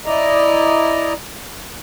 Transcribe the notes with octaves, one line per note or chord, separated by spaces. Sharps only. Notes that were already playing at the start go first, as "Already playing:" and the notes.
E4 D5 D#5 A#5